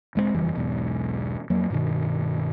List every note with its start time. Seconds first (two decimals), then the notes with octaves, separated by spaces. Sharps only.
0.15 E1 G#3 A3 C4
0.34 F#1 F2 E3 G3
0.55 E1 B1 E2 G#2
1.50 F2 F#3 A#3
1.70 G2 B2 D#3